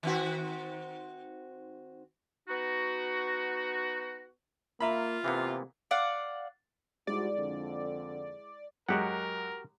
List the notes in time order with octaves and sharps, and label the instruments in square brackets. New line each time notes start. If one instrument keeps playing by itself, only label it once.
[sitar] D#3 C4 F#4
[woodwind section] B3 D#4 F#4
[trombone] A#3 [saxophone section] F4 [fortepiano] E5 A#5 B5
[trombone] C3 [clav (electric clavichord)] E3 A#3 B3
[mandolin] D5 F5 F#5
[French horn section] G#2 G3 F#4 [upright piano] G#3 E4 [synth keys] D5
[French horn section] F2 D3
[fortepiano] F#2 G#3 [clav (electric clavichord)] F#4 G4 F#5 [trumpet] A#4